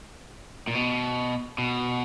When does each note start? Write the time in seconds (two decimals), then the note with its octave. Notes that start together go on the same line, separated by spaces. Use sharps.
0.68 A#2
0.74 B2
1.58 B2